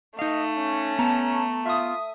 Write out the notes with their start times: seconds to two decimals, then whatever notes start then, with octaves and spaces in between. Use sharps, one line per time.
0.19 A3 D#4 D#5 F5
0.58 C#4
0.99 B3 A5 A#5
1.66 F4 E5 D#6